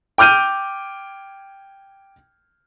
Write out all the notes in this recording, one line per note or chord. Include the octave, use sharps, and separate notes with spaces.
G5 D6 F6 G6 D#7